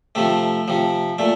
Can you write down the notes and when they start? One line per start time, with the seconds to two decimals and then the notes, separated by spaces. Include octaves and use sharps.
0.15 C3 F3 A3
0.68 C3 F3
1.19 A#2 A3